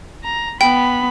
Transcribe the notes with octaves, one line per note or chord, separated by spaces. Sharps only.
A#5
B3 G5 B5